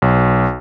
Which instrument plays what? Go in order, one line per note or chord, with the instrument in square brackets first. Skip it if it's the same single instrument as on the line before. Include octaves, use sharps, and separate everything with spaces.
[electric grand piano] B1